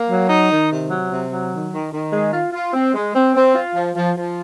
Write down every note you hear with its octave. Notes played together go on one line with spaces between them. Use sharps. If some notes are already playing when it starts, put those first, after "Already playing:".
Already playing: A#3
F#3
D#4
D#3
C3
F#3
C3
F#3
D#3
D#3
D#3
G#3
F4
F4
C4
G#3
C4
C4
F4
F3
F3
F3